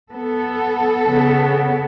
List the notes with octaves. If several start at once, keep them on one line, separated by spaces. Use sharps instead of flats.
B3 A4
C#3 B3